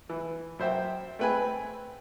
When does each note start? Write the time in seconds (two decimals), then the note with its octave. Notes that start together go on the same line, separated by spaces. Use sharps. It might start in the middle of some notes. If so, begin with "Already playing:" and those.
0.09 E3
0.59 F#2 C5 E5 G5
1.19 A3 C4 B4 G5 G#5